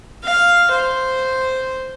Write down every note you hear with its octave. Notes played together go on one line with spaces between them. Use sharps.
F5
C5